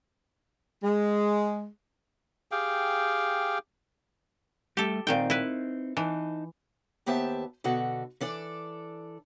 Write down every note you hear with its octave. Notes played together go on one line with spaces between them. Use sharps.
G#3
G4 G#4 F5 G5
G3 A3 G4 A4
A#2 D#3 C4 D#4 G5
E4 B4
E3 D#4 D#5 A5
D#2 B3 G4 C5 E5 A5
B2 D3 F#4 A4
E3 D4 A4 D5